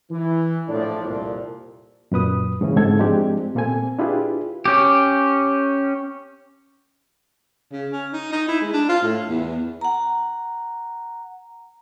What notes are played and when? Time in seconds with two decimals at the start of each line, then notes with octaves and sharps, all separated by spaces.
0.11 E3
0.68 A#1 A2 F3 D4 D5
1.04 C2 F2 A#2
2.12 F#2 A#2 B4 D#6
2.61 G#2 C#3 E3 C#4
2.77 G#2 C4 A4 G#6
2.99 F3 G#3 C4 D4 G4
3.55 A#2 A#3 C4 A4 G#5
3.99 D4 E4 F4 G4 G#4 B4
4.65 C#4 G4
7.72 C#3
7.92 C#4
8.13 D#4
8.32 D#4
8.48 E4
8.61 G#3
8.73 D4
8.89 F4
9.02 A2
9.28 E2
9.81 F#5 A#5